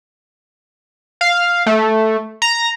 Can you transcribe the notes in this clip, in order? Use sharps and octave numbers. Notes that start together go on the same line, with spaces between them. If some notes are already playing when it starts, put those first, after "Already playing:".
F5
A3
A#5